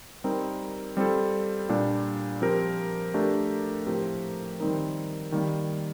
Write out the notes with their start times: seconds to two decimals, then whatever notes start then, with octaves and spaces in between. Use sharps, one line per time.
0.24 G3 C4 D#4 A#4
0.97 G3 C4 F4 A4
1.69 A#2 G3 D4
2.42 F3 C4 G4 A#4
3.14 A3 D4 G4 A#4
3.87 A2 F3 C4 G4 A#4
4.60 D#3 G3 C4 D#4 A#4
5.32 D#3 G3 A#3